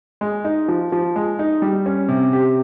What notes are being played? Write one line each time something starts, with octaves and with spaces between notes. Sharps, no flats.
G#3
D#4
F3
F3
G#3
D#4
G3
C#4
C3
G4